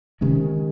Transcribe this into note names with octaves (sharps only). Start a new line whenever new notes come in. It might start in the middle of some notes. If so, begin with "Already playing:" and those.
C3 D#3 G#3 C#4